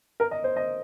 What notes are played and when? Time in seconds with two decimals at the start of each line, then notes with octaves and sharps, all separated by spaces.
0.20 A#4
0.31 D#5
0.44 C5
0.56 D#5